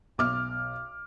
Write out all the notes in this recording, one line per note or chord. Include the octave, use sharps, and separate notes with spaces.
B1 D6 F6